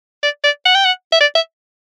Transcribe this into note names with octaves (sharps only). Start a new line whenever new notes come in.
D5
D5
F#5
G5
F#5
E5
D5
E5